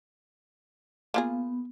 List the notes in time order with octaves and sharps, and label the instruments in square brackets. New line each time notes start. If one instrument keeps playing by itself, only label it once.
[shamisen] A#3 F4 G#4 [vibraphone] B3